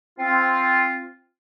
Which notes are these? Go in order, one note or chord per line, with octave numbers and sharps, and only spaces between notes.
C4 F4